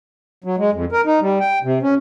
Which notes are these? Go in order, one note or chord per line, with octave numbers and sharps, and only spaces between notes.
F#3
G#3
F2
A#4
D#4
G3
G5
C3
C#4